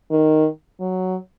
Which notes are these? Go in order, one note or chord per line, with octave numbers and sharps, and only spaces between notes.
D#3
F#3